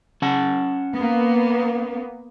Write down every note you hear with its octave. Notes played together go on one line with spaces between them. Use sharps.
C#4 F#5 A5
A#3 B3